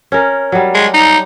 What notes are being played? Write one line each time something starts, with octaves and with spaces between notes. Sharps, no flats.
C#4 A#4
F#3 G3
G#3
D#4